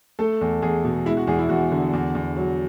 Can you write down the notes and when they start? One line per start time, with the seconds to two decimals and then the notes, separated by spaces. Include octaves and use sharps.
0.19 A3 A4
0.41 E2
0.62 E2 G#4
0.85 B2
1.06 G#3 E4
1.17 F#4
1.27 E2 G#4
1.39 E4
1.49 E2 F#4
1.72 D3
1.93 E2
2.15 E2
2.37 F#3